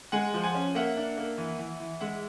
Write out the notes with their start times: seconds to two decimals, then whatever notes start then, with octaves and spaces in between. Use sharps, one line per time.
0.12 G#3 F#5 G#5
0.34 F3
0.44 F#5 G#5
0.55 C#4
0.75 A#3 E5 F#5
0.97 D4
1.18 A#3
1.38 E3
1.59 E3
1.80 E3
2.01 G#3 E5 F#5